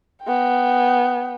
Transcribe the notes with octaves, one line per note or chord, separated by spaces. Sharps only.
B3 G5